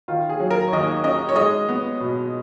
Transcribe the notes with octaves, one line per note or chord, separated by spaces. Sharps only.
D#3 F4
G#4
F#3
A#4
C#5
D#2 D#5
C#4 D#5
C#5
G#3 D#5
B3
B2